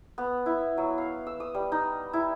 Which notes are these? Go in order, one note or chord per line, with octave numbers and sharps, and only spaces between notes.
B3
E4
F#3
F5
E6
D#6
G3
D#4
E4